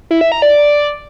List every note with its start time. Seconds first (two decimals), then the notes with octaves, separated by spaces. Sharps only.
0.11 E4
0.21 E5
0.32 A#5
0.42 D5